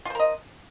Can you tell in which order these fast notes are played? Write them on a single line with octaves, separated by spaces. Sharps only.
F4 C5 A#4 D#5